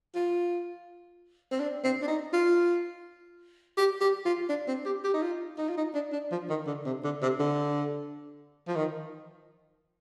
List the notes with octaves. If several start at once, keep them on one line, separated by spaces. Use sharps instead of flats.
F4
C4
D4
C4
D4
D#4
F4
G4
G4
F4
D4
C4
G4
G4
D#4
F4
D#4
F4
D#4
D4
D4
F3
D#3
D3
C3
D3
C3
D3
F3
D#3